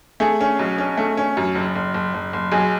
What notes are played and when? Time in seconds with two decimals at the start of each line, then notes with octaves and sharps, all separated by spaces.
0.20 A3 G#4
0.41 C#4
0.59 B1
0.78 C#4
0.97 A3
1.17 C#4
1.37 F#2
1.55 F#1
1.75 F#1
1.94 F#1
2.14 F#1
2.33 F#1
2.52 B1 G#4